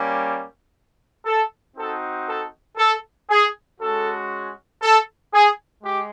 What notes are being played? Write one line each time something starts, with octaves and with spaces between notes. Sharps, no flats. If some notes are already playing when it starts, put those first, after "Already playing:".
Already playing: G3 A#3 C#4
A4
C4 D#4 F#4 A4
A4
A4
G#4
G#3 C#4 F#4 A4
A4
G#4
G#3 G4